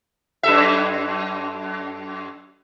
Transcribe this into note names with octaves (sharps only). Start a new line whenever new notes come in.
F#2 A4 E5